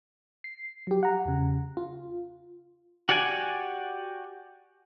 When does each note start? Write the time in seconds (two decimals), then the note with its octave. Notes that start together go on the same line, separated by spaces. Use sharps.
0.44 C7
0.87 F#3 G4
1.03 F#5 A#5
1.25 E2 C#3
1.77 F4
3.09 F#4 G4 D5 F#5 G#5